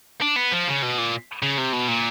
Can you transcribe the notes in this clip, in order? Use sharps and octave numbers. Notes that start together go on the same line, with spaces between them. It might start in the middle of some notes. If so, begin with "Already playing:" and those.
D4
B3
F3
C#3
B2
A#2
C#3
C3
B2
A#2